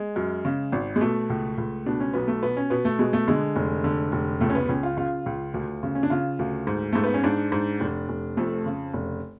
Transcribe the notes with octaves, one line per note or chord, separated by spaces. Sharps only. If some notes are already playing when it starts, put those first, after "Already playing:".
Already playing: G#3
F#2
C#3
G#1
G#3
B2 A3
C#2
C#2
B2 D4
C#4
B1 B3
A3
B2 B3
C#4
B2 B3
A3
B2 G#3
A3
D3 G#3
F1
D3
F1
C#2 A3
C#4
B3
C#2 C#4
F4
C#3 F4
C#2
D2
C#3
C#4
D4
C#3 F4
D2
G#2
G#2 A3
B3
C#4
G#2 D4
G#2
F1
F1
F2 A3
C#3
F1